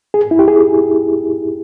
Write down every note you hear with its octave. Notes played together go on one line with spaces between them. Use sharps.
G#4
E4
G4
G#4